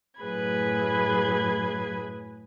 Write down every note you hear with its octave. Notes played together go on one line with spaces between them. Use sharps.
F#2 A2 G#4 B4 B5 G#6